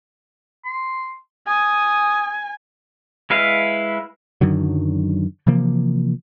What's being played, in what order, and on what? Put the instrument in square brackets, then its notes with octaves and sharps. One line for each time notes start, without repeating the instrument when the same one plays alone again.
[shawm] C6
[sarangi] G#5 [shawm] D#6
[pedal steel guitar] G#3 E4 B4 F5
[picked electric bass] F#2 D3 D#3 F#3
C3 E3 F3 A#3